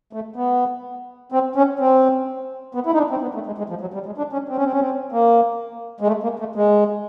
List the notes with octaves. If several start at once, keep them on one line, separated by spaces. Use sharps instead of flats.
A3
B3
C4
C#4
C4
B3
E4
D#4
D4
C4
B3
A3
G#3
G#3
F3
F#3
G3
G#3
D4
C#4
C4
C#4
C4
C#4
C4
A#3
G#3
A3
A#3
A3
G#3